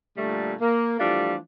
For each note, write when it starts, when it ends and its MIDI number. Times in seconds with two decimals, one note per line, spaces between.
0.17 0.54 46
0.17 0.54 50
0.17 0.54 55
0.17 0.54 57
0.61 0.98 58
1.00 1.36 52
1.00 1.36 53
1.00 1.36 55
1.00 1.36 57
1.00 1.36 62
1.00 1.36 65